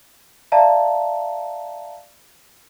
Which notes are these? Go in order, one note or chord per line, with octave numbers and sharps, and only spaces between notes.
D5 E5 F5 A5 A#5